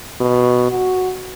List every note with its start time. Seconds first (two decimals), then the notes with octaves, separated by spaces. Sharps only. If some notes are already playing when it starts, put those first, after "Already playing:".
0.21 B2
0.71 F#4